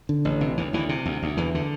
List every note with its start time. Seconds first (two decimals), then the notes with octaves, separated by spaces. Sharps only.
0.09 D3
0.25 A1
0.41 C3
0.58 D2 E3
0.73 D2 E3
0.89 C3
1.06 D2
1.22 D2
1.37 E2 E3
1.55 D3